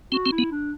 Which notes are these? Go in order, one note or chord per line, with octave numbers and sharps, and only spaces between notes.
C4 F#4
C4
E4
B3
D4